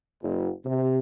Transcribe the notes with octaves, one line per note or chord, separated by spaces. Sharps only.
F#1
C3